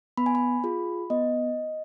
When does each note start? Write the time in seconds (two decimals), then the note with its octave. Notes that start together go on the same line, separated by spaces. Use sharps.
0.17 B3 B5
0.26 G#5
0.35 B5
0.64 F4 G#4
1.10 B3 D#5